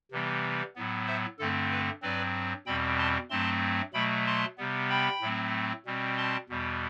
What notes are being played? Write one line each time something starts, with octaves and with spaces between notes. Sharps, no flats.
C3 E3 G3 B3
A2 F#3 B3
C5 E5
G2 D3 A3 C4 A4
B4
G2 F#3 C4 B4 D5
E2 B2 G3 C4 G5 B5
A5 C6
G2 F#3 A3 C4 A5 C6
B2 F#3 A3 G5 B5
A5 C6
C3 G3 B3
G5 B5
A2 F#3 A3 C4
B2 G3 C4
A5 C6
E2 B2 G3 B3